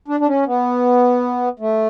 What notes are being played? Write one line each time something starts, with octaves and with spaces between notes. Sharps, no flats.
D4
D4
C#4
B3
A3